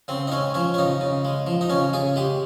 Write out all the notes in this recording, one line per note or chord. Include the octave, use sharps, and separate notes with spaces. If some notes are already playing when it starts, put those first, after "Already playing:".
C#3 C4
D#4
G#3 C#4
F3 C#4
C#4
C#3 D#4
C#3
G#3
F3
D#4
C#3 C#4
C#3 G#4
G#3 G4